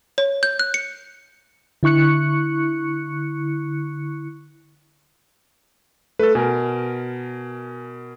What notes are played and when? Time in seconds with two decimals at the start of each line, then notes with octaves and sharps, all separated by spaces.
0.18 C#5
0.43 G6
0.59 F#6
0.74 C#7
1.83 D3 E4 C#6 F#6 C#7
6.19 A3 A4 B4
6.35 B2 A#4 G#5